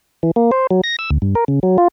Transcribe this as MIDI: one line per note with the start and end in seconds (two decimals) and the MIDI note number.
0.23 0.31 52
0.36 0.51 58
0.52 0.67 72
0.71 0.81 54
0.84 0.96 94
0.99 1.10 88
1.10 1.18 38
1.22 1.35 43
1.35 1.44 70
1.48 1.60 49
1.63 1.77 54
1.78 1.88 65